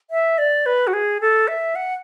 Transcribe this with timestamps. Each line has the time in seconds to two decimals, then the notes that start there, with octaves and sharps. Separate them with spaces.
0.11 E5
0.38 D5
0.66 B4
0.87 F#4
0.93 G#4
1.21 A4
1.48 E5
1.75 F#5